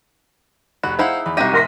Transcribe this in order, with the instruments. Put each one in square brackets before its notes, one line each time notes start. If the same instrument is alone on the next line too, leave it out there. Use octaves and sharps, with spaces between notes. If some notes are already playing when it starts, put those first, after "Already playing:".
[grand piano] F1 B5 F#6 [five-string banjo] F#4
[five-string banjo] D#4 E4 G#4 [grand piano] C5 F5 F#5
[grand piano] E2 B5
[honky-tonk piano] C2 C3 D#7 [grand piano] D#4 E5 A#6 [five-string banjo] F#4 G4
[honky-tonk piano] F1 C6 B6 [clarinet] A#4